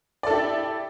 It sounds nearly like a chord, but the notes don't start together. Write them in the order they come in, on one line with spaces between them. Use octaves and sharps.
D5 A4 E4 G4